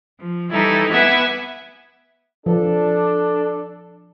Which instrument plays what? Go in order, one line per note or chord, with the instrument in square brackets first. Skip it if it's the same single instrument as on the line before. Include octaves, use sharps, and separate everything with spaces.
[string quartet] F3
E3 G3 D#4 E4 A4
B3 B4 E5 F#5 G#5 D6
[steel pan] F3 [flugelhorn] D4 [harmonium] A4